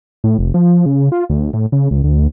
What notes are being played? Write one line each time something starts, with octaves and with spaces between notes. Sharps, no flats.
A2
F1
F3
C#3
F4
D2
A2
C#3
C#2
D2